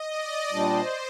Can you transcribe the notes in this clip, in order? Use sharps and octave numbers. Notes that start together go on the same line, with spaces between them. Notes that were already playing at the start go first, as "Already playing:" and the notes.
Already playing: D#5
D5
A#2 G3 D4 C5